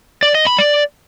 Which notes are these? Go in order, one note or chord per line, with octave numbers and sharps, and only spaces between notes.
D5
D#5
B5
D5